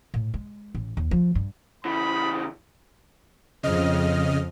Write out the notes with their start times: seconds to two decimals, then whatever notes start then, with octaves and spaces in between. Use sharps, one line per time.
0.14 A2
0.34 G#3
0.75 A1
0.97 D#2
1.11 F3
1.35 G2
1.85 C#3 E3 B5
3.63 F2 C#3 D#5 F6